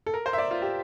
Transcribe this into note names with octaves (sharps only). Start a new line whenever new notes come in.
A4
A#4
C5
E5
D5
F4
G4